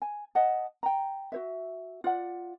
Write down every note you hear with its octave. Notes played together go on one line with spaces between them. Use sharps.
G#5
D#5 F#5 A5
G5 A#5
F#4 C5 E5
F4 D5 F#5